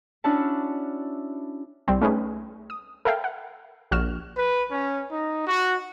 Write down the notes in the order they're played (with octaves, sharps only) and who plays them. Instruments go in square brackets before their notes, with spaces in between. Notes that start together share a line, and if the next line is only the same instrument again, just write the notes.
[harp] C#4 D4 E4 F#4 F#5 A5
[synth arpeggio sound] C2 G3 C4
A3 C#4 D#4 G#4 B4
D#6
A4 A#4 E5 F5 G5
F#5
A#1 F#4 F6 E7
[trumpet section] B4
C#4
D#4
F#4